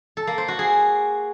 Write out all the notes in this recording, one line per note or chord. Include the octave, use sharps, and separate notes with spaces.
A4
A#3
C5
F#4
G#4